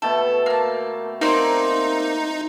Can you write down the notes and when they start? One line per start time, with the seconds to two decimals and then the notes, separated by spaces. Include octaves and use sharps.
0.02 B2 A3 A4 G5
0.46 A#3 A5
1.21 A#3 C4 D#4 D5